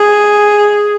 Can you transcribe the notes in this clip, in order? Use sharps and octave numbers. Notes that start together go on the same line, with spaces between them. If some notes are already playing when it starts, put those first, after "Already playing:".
Already playing: G#4